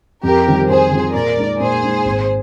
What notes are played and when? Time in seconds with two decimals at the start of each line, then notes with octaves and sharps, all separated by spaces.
0.23 F2 G4 A#4
0.46 D#3 G3 C4 F4
0.69 F2 G#4 C5
0.91 D#3 G3 C4 F4
1.14 A#2 A#4 D5
1.37 G#3 D#4
1.60 A#2 G#4 C5
1.83 G#3 D#4
2.05 G#1